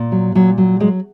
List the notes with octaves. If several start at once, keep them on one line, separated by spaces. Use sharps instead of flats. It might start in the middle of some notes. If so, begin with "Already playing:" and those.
Already playing: A#2
F#3
A#2 F#3
F#3
F#3 G#3